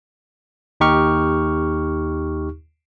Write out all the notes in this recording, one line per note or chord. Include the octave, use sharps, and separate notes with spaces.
D#2 D#4 G4 C#6 F6